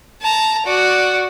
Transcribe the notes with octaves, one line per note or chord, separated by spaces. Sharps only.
A5 A#5
F#4 D5